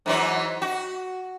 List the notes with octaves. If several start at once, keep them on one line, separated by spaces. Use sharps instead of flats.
G#2 E3 F#3
F#4